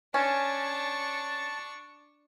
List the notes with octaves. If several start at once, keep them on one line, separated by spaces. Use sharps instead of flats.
C#4 D4 A5 C#6